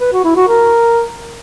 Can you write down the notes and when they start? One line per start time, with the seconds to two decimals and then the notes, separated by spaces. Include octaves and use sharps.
0.01 B4
0.13 F#4
0.24 E4
0.36 F#4
0.48 A#4